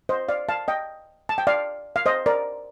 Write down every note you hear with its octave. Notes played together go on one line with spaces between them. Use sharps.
C5 D#5
D5 F5
F5 A5
D#5 G5
A5
G5
D5 F5
F5
C5 D#5
A#4 D5